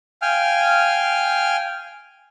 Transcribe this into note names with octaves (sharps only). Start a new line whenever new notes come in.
F5 G5 G#5 F6